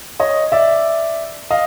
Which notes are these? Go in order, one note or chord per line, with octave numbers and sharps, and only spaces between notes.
C#5 D#5
D5 E5
D#5 F5